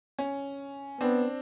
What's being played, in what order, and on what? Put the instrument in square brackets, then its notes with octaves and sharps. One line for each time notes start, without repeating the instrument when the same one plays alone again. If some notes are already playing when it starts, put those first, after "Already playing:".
[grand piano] C#4
[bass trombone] B3 [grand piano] C4 D4